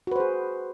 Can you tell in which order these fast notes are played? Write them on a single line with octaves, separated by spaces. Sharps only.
F#4 B4 C5 G#4